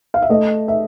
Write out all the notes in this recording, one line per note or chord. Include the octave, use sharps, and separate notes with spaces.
F5
E5
A3 D#5
E5